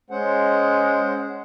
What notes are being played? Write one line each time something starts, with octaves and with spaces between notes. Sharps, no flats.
G#3 C#4 C5 F#5